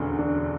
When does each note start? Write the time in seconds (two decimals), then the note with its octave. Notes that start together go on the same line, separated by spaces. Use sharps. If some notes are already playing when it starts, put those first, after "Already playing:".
Already playing: E1 D2 D3 C#4
0.19 D4